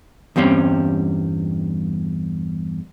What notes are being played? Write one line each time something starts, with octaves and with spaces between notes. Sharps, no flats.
E2 G2 G3 C4 C#4